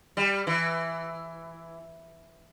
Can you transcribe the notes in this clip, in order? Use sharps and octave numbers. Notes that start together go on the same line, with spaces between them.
G3
E3